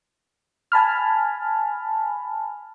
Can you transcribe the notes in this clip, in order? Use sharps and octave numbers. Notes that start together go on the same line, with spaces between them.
G#5 A5 B5 F6